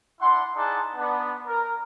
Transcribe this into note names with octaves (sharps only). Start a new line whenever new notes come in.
D4 E4 F#5 C6
D#4 E4 G#4 D5 F#5 A5
B3 D4
A#4